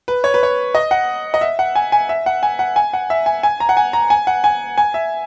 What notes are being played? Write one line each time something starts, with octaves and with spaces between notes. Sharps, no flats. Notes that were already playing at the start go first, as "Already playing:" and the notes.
B4
C#5
B4
C#5
D#5
F#5
D#5
E5
F#5
G#5
G#5
E5
F#5
G#5
F#5
G#5
F#5
E5
G#5
G#5
A#5
F#5
G#5
A#5
G#5
F#5
G#5
G#5
E5